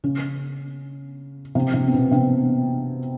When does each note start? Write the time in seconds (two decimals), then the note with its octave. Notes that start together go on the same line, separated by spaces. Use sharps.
0.04 C#3 C#4
1.55 C3 C4
1.74 C3 C4
1.88 C4
1.92 B2 B3
2.11 C3 C4